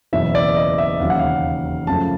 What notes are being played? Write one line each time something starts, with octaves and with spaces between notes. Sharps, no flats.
F#1 E2 B2 F#3 E5
D5
D#5
E5
E1 D#2 C#3 F#3 F5
F#5
F5
F#2 C#3 F3 A3 A5